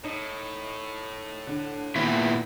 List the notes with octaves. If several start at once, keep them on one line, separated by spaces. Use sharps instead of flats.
A2 D#4
D3
A#2 D#3 E3 B3 C4 E4 E7